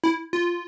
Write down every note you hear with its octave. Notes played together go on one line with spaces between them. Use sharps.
E4
F4